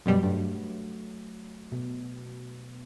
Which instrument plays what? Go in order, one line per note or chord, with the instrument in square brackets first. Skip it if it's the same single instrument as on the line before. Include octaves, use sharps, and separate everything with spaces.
[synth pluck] F#2 B2 G3 [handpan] F#3
[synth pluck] G2 [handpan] A3
[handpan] B2